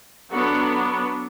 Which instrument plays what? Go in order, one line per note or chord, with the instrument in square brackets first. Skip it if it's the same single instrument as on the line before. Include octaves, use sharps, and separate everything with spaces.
[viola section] F#3 B3 D4 F#4 A4